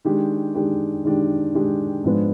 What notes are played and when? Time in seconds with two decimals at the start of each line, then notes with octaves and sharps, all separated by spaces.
0.05 D#3 G#3 D4 G4
0.55 D#3 G#3 D4 G4
1.05 D#3 G#3 D4 G4
1.55 D#3 G#3 D4 G4
2.04 G#2 F3 G#3 B3 D4